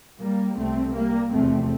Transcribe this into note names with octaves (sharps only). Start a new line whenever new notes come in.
G3 A#3
C2 C3 A3 C4
G3 A#3
F1 E2 C3 A3 C4